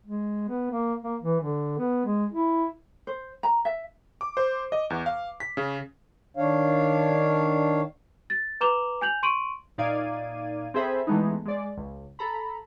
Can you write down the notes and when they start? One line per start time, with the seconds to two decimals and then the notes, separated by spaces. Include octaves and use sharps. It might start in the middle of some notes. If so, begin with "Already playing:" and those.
0.06 G#3
0.48 B3
0.71 A#3
1.03 A#3
1.22 E3
1.41 D3
1.79 B3
2.06 G#3
2.33 E4
3.07 C5
3.43 A#5
3.65 E5
4.21 D6
4.37 C5
4.72 D#5
4.90 E2
5.06 F5
5.40 B6
5.57 C#3
6.37 D#3 D4 C#5 F5
8.30 A6
8.61 B4 A#5 D6 E7 F7 G7
9.01 G#5 G6 F7 F#7
9.23 C6 C#6 D7 D#7 F#7
9.78 A#2 D#4 D5 F5 G#6 D#7
10.74 C4 G#4 A4 C5 E5 B5
11.07 E3 G#3 A3 B3 D#4
11.46 G#3 D5
11.77 C#2
12.19 A4 A#5 B5